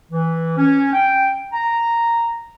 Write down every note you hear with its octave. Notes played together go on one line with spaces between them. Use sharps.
E3
C#4
G5
A#5